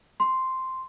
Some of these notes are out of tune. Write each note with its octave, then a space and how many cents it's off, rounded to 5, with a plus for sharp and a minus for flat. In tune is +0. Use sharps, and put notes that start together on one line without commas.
C6 -5